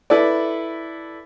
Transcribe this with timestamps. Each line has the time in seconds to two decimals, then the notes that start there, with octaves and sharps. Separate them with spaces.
0.10 E4 A4 B4 D5